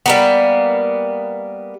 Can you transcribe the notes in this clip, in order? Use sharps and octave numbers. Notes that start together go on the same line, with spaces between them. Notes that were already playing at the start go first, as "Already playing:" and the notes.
G3 A#3 B3